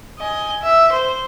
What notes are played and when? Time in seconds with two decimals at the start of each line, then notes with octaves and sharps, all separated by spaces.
0.19 D#5 G#5
0.62 E5
0.92 C5